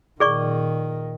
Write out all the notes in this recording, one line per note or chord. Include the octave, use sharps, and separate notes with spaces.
A#2 D#3 G#4 D5 C#6